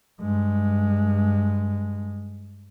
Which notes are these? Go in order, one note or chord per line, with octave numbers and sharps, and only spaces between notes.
G2 G#3